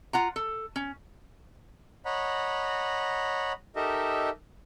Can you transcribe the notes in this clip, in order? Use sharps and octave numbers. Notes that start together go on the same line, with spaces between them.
F4 F#5 A#5
A4
C#4
C#5 D#5 F#5 A#5 B5
D#4 G4 A4 A#4 D#5 E5